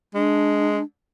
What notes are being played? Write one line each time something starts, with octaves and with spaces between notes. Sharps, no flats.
G#3 D4